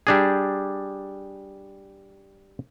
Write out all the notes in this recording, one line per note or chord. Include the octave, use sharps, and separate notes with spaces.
G3 D4 G#4